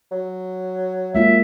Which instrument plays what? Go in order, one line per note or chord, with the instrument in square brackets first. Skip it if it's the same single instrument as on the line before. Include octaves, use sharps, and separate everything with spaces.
[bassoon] F#3
[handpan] G#3 A#3 F4 [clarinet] E5